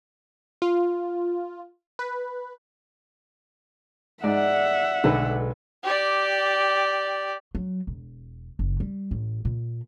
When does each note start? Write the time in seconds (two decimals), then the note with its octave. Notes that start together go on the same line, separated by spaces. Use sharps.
0.62 F4
1.99 B4
4.24 G#2 D5 E5 F#5
5.04 B1 D3 G#3 A4 B4
5.83 G4 D5
7.55 F#3
7.87 E1
8.59 F#1
8.80 G3
9.11 A1
9.45 A#2